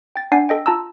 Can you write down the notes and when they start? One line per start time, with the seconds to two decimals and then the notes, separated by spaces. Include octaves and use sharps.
0.16 G5 A6
0.32 D4 D5 F#5 G#5 C7
0.49 A4 D#5 G5
0.66 F4 A5 A#5 E6